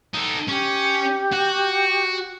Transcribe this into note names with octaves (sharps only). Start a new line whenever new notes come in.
D#4 A4
C#4 G4
F#4